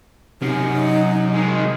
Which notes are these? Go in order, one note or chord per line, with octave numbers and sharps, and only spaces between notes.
F#2 C3 D#4
D#3 G#3